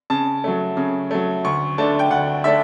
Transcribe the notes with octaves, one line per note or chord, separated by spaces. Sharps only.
C#3 A5
F#3 A3
C#3
F#3 A3
D2 C#6
D3 A3 D4 A5
G5
D2 F#5
D3 A3 D4 E5